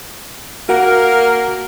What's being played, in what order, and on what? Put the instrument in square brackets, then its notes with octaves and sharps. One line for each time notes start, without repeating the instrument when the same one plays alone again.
[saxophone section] A#3 A#4 [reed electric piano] F#4 F#5